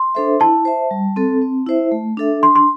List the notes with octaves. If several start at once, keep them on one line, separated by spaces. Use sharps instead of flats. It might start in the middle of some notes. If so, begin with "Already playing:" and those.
Already playing: C6
D4 A4 C5 E5
E4 A5
C5 E5
G3
C4 A4
C4
E4 C5 E5
A3
D4 A4 E5
D4 C6
C6